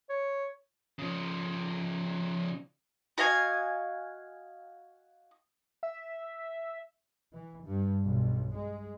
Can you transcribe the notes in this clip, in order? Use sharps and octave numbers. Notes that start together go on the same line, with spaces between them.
C#5
C#3 F3
F#4 D#5 F5 G#5
E5
E3
G2
B1
G#3